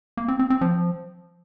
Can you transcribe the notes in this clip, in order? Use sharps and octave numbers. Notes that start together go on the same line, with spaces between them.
A#3
C4
C4
C4
F3